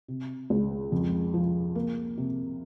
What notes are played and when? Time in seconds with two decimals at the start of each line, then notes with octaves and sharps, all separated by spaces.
0.08 C3
0.50 C#2
0.92 F2
1.34 F3
1.75 A#3
2.18 C3